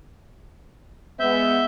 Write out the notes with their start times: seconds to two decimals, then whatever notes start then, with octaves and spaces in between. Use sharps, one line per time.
1.20 G#3 B3 E5 G6